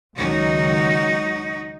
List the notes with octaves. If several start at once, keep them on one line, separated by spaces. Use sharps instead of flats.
C#2 D#3 F#3 D#4 F#4